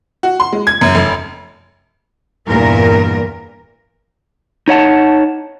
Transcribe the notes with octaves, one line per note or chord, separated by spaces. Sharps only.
F#4
C6
G#3
G#6
F#2
F1
E2 G2 A#2 A#4
D#4 C#5 F#5 A5